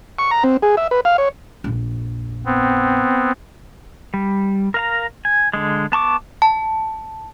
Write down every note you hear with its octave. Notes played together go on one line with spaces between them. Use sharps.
C#6
A#5
C4
G#4
E5
B4
F5
C#5
A#1 F2
B3 C4
G3
A#4 F5 A#5
G#5
D3 G#3
B3 A5 C#6 D6
A5